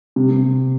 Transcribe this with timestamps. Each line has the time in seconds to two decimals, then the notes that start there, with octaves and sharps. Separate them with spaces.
0.16 C3
0.31 C3